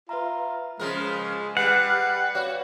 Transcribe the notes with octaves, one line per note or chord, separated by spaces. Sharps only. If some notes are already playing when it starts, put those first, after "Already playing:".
F4 B4 E5 A#5
C#3 F3 G#3 A#4 F6
G3 B4 F#5 C7
F#4 C#5 D5 F5